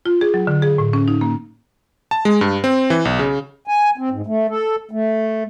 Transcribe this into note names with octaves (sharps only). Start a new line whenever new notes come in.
F4
G#4
F#3
D3
G#4
A2
C#4
D#4
A#3
A5
G#3
G2
C4
E3
B1
C#3
G#5
C4
G#2
A3
A4
A3